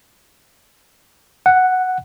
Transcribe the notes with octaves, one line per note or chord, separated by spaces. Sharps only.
F#5